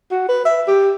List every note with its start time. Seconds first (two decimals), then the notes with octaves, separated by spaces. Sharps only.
0.11 F#4
0.29 B4
0.45 E5
0.68 G4